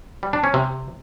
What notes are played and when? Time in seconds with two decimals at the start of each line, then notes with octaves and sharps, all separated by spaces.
0.23 G3
0.33 D4
0.44 C#4
0.54 C3